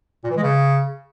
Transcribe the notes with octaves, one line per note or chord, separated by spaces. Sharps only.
A#2
E3
G#3
C#3